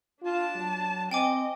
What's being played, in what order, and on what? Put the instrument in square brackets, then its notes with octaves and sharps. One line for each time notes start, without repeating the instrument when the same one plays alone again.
[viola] D4 A5 [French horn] F4
[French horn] F#3
[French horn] C4 [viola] D#5 [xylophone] G5 G#5 D6